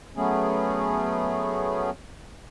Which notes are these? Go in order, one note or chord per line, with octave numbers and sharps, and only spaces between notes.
F#3 A3 B3 C#4 G#4